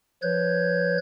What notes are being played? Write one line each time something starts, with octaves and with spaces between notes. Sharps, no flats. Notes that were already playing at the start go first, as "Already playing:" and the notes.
F3 B4 C#5 G6 G#6